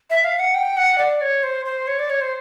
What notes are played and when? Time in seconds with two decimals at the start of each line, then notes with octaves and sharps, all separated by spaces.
0.10 E5
0.24 F5
0.39 F#5
0.55 G5
0.77 F#5
0.98 D5
1.21 C#5
1.43 C5
1.65 C5
1.87 C#5
1.99 D5
2.10 C#5
2.21 C5